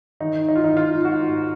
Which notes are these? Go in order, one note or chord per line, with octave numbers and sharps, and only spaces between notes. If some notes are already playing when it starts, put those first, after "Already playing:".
D#3 D#4
D#4
F4
D#3 D#4
F4
G#2 F#4